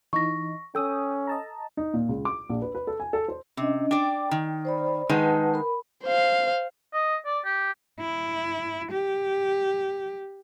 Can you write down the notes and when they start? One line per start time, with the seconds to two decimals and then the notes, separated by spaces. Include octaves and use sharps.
0.13 E3 D#4 C#6 A#6
0.75 C#4 A4 G5 D#6 E6
1.27 D#5 A5 A#5
1.77 D#4
1.94 A#2
2.09 C#2
2.25 D6
2.49 A#1
2.62 B4
2.75 B4
2.87 A4
3.00 G#5
3.13 A4
3.28 C5
3.57 C3 C#4 D4 D#5
3.91 D4 D5 G5
4.31 D#3
4.65 C5 D5 B5
5.09 D#3 G#3 D#4 B4 F#5 A5
5.54 A#4 B5
6.04 C5 F5
6.93 D#5
7.26 D5
7.45 G4
8.00 E4
8.92 G4